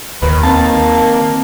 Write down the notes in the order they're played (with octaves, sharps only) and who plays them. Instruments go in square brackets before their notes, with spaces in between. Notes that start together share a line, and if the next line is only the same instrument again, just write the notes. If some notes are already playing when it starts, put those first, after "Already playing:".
[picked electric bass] D#2 [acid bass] D#3 [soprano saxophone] B4
[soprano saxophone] A#3 [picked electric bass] C4 [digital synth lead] A5